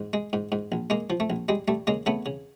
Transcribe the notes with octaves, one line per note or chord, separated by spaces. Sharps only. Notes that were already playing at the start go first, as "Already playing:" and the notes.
Already playing: G#2
G#3
G#2
G#2
A#1
G#3 A#3
F3
A3
A#1
G3 G#3
G3 A3
C#3 G#3 A#3
C#3 A3 B3
C#3